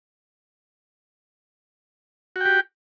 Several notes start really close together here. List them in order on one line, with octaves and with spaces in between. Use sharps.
F#4 G5 G4